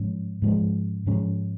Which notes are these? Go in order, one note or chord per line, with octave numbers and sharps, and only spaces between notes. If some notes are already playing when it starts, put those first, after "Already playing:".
Already playing: G#2 F3 G#3 C#4
G#2 F3 G#3 C#4
G#2 F3 G#3 C#4